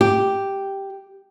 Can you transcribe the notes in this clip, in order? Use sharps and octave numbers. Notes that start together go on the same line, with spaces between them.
G4